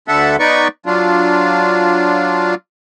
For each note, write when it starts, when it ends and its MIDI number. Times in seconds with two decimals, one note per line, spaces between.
0.08 0.36 38
0.08 0.36 50
0.08 0.36 69
0.08 0.36 76
0.08 0.36 78
0.39 0.68 59
0.39 0.68 63
0.39 0.68 71
0.39 0.68 74
0.39 0.68 85
0.86 2.55 54
0.86 2.55 62
0.86 2.55 65